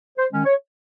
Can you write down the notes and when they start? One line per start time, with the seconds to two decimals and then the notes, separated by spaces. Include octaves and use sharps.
0.17 C5
0.31 D#3 G#3 C#4
0.45 C#5